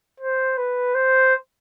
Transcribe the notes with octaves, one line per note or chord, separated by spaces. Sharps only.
C5
B4
C5